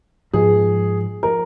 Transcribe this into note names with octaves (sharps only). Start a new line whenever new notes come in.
G#2 F3 G#3 B3 G#4
F3 A#4